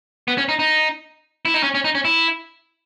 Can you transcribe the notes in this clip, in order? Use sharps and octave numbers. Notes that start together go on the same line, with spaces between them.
B3
C#4
D#4
D#4
E4
D#4
C#4
C#4
D#4
C#4
E4